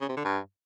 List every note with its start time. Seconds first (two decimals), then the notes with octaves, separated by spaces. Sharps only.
0.01 C#3
0.09 C3
0.17 D3
0.24 G2